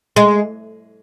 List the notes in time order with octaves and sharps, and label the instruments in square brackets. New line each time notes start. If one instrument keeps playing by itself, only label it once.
[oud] G#3